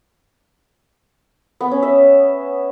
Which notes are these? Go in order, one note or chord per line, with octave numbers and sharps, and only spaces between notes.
B3
C#4
E5